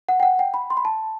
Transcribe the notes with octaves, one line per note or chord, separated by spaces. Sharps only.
F#5
G5
F#5
G5
B5
C6
B5
A5